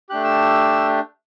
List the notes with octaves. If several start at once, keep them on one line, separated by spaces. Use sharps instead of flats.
A3 D4 G4 F#6
E6